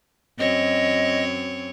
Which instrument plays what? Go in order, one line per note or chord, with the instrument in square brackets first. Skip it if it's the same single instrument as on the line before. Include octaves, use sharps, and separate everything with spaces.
[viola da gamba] F#2 C4 C#5 [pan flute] D#5